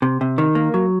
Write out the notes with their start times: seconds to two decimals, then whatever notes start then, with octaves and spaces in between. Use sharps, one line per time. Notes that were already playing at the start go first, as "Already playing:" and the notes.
0.02 C3
0.21 C3
0.38 D#3
0.55 A#3
0.74 F#3